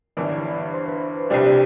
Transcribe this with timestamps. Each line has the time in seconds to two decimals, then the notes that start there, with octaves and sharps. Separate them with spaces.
0.17 G1 G2 E3 D5
0.74 C5
0.88 B4
1.30 C2 C3 G3 D4 C5
1.46 D5